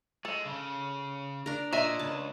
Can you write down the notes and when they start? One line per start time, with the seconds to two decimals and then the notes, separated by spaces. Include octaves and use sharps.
0.25 G#3 A4
0.45 C#3
1.46 D4 A#4
1.73 A#2 D#5 E5 G#5
1.99 C#2 A5